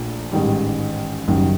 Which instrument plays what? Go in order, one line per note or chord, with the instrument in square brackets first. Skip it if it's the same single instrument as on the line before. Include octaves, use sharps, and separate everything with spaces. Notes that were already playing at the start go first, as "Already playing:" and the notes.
Already playing: [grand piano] A#1 A#2 A3
A1 G#2 D#3 G3
F#1 F#2 D#3 G3